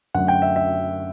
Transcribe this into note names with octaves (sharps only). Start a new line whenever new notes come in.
F#2 D3 F#3 A3 F#5
G5
E5
E5